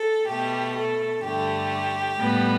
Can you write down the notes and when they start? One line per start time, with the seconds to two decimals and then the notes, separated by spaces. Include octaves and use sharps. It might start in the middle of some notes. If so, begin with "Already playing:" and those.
Already playing: A4
0.28 B2 A3 G4
0.76 A4
1.23 G2 D3 A3 G4
2.20 A2 G3 B3